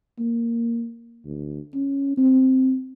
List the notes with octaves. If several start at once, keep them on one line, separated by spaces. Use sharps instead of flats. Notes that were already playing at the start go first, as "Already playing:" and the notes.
A#3
D2
C#4
C4